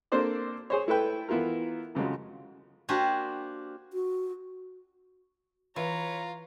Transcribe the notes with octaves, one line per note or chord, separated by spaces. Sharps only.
A#3 C4 D4 A4 C5 D5
G#4 C5 C#5
A3 E4 A4 B4 G5
E3 B3 E4 F4 A#4
F2 C#3 F#3 G#3
A#3 D4 F#4 G4 C5 G#5
F#4
E3 F4 B4 C#5 A#5